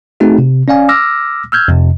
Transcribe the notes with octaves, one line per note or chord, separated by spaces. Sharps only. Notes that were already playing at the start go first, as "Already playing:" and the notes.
A3 C4 D#4 F#4 G#4
C3
C#4 D5 F5 G#5
D6 E6 F6 A#6
E6 F6 G6 G#6
F2 C3